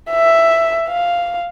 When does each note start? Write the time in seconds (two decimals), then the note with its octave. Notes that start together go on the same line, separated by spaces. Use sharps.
0.11 E5
0.88 F5